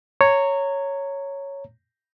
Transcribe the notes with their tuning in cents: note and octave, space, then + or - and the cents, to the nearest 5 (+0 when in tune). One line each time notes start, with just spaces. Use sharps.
C#5 +0 A#5 -20